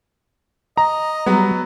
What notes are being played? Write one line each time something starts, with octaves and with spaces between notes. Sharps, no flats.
D#5 A#5
F#3 G3 B3